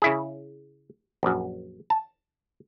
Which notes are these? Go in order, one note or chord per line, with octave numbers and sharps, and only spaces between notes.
C#3 E4 G#4
A#1 F#2
A5